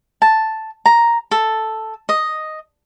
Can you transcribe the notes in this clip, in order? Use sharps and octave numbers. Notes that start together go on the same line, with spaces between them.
A5
A#5
A4
D#5